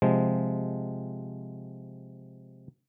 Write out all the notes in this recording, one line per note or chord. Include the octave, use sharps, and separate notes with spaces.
C3 F3 G#3